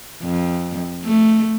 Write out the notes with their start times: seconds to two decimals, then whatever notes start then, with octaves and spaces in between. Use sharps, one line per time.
0.23 F2
1.04 A3